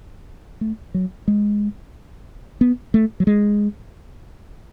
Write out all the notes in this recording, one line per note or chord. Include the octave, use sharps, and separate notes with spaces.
A3
F#3
G#3
B3
A3
F#3
G#3